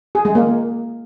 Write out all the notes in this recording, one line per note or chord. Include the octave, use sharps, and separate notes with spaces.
G#4
G#3
A#3